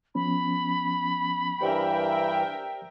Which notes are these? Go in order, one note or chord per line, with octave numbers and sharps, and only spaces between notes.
F3 B3 C#4 B5
G2 E3 G4 A#4 C5 D5 E5 G5